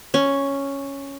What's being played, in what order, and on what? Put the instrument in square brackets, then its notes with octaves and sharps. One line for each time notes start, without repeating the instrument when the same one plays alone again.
[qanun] C#4